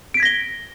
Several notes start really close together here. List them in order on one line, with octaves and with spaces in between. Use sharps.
D7 B6 G#6 A#6 G7